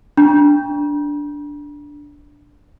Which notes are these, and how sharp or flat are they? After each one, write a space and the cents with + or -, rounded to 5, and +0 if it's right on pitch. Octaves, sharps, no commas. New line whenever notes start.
D4 -5 A#5 +45